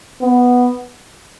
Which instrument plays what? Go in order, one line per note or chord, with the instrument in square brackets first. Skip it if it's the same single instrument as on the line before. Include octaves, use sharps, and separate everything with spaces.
[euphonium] B3